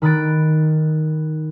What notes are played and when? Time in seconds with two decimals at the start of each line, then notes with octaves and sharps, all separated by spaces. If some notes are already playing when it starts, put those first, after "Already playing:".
0.02 D#3 B5 D#6 F#6 A6 D7